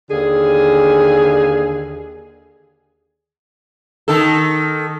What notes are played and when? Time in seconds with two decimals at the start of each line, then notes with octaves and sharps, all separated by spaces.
0.10 D#2 D3 G#4
4.08 D#3 A4